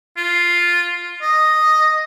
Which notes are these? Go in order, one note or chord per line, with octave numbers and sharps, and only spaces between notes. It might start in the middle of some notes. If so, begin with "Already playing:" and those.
F4
D#5